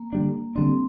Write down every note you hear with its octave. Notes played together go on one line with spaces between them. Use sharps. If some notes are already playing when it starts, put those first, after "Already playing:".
Already playing: A#3
D3 G3 D4
D3 G3 C4 D4